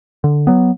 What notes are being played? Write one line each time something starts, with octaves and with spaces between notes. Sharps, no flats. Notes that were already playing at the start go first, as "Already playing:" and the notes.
D3
F#3 B3